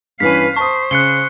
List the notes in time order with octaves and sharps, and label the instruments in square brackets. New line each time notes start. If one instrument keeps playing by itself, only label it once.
[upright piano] G2 E3 C#4 [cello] B4 F5 [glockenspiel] B6
[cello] C5 [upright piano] A5 D#6 [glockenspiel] C#6
[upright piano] C#3 [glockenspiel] F#6 C#7 G7